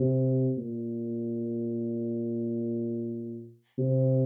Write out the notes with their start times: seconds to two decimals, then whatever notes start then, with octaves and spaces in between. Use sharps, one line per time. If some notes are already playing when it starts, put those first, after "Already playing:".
Already playing: C3
0.58 A#2
3.79 C3